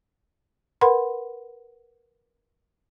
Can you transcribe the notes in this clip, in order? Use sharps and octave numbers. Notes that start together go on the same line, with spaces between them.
A#4 B4 F#5 B5 C6